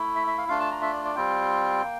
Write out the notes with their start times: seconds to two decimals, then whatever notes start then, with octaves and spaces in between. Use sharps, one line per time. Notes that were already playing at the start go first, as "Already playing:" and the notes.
Already playing: A3 E4
0.16 E5
0.27 E5
0.38 F5
0.48 A3 D4 F4 F5
0.60 A5
0.71 A#5
0.82 E5
0.93 D5
1.05 D5
1.15 G3 C4 F4 G5
1.83 A#3